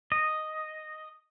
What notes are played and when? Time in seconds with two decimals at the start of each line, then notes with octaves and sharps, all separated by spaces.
0.12 D#5